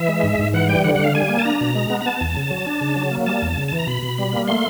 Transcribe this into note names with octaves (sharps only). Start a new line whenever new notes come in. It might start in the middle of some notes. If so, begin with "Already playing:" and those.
Already playing: E3 E5
G#3
G#2
G#2
E3 F#5
G3 G5
D3 F#5
F#5
D3 F5
G3 G#5
A#3
A5
D4 A#5
B2
G#3
B3
A#5
B3 A5
E2
C#3
F#3
D4
C#3
F#3
A#3
G3 A5
E2
C#3
E3 A5
A#5
B2 B5
B2
G3
A#3
A3 C6